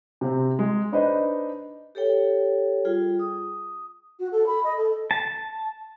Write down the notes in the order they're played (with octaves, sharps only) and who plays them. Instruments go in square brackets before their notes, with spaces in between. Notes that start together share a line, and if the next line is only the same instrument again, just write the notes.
[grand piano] C3 C4
G#3
D4 D#4 B4 C5 D#5
[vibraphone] G4 A4 C#5 G5
G3 F4 G#4 G5
D#6
[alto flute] F#4
A4
B5
D#5
A4
[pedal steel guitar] A5